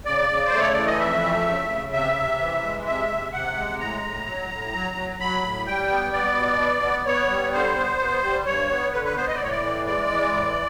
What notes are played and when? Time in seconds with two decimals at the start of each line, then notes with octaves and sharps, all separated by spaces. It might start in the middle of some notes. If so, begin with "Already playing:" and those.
0.06 C#3 D5
0.29 C#3
0.46 C5
0.53 A3
0.59 C#5
0.73 E3 D5
0.86 D#5
0.99 F2 E5
1.23 A3
1.45 C#3
1.69 C#3
1.93 C3 E5
2.15 C3
2.39 E3
2.63 G#3
2.86 C3 E5
3.09 C3
3.33 C3 F#5
3.56 G#3
3.79 A2 A#5
4.03 A2
4.25 F#3
4.49 A2
4.73 F#3
4.95 F#3
5.19 F#3 B5
5.42 A2
5.66 G3 G5
5.89 B3
6.12 B3 D5
6.36 B2
6.59 B3
6.82 B3
7.06 B3 C#5
7.29 G3
7.53 D3 C5
7.76 B3
7.99 B3
8.23 G3
8.46 G2 C#5
8.70 B3
8.93 D3 B4
9.05 B4
9.16 B3 C5
9.28 D#5
9.35 D5
9.40 A2 C#5
9.50 D5
9.63 E3
9.86 G#3 D5
10.09 E3
10.33 A2